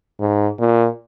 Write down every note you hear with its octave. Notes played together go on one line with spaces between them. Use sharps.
G#2
A#2